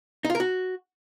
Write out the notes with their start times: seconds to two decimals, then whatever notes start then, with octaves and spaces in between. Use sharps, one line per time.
0.25 D#4
0.30 F4
0.35 A#4
0.40 F#4